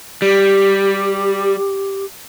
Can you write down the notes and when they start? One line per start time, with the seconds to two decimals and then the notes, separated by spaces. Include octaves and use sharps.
0.22 G3 G4